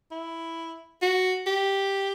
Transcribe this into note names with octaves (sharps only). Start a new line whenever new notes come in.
E4
F#4
G4